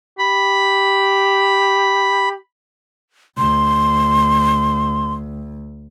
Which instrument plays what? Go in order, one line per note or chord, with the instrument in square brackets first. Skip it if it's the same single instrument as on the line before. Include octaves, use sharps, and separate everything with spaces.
[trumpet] G4 [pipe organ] B5
[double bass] D2 [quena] C6